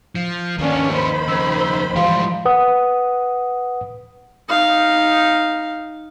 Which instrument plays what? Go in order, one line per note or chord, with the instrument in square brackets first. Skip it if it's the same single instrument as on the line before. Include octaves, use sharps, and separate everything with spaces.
[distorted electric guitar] F3
[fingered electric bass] D#2 [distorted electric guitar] F3 B3 [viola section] A#3 C#4 D4
[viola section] D#3 C5 B5
[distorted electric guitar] F2 C#3 [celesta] E6 G#6
[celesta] E6 G7
[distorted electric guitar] G#2 G3 [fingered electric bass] E3 F3 [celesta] F5 C6
[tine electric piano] B4 F#5 D#6
[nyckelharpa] D#4 F5